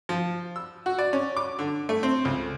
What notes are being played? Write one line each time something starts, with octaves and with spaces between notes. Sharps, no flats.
F3
E6
F#4
D5
C#4
D6
D3
A3
C4
C#2